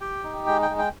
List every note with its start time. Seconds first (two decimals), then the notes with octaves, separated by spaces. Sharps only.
0.01 G4 G5
0.24 D#4
0.47 G#3 G5
0.62 G5
0.70 G#3
0.78 G5